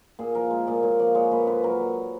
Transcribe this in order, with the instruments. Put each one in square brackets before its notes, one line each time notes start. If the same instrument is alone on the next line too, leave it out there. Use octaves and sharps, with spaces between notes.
[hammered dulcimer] A#2 G#4
F3 A#4
G#3
A#2 D5
A#2 C#5
F3 D5
G#3 C#5
A#2 B4
D3 B4
F#3 A#4